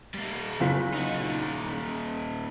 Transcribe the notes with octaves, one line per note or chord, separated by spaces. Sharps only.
G3 A#3
F#1 F4 B6
D#4 F#4
A#2 D#3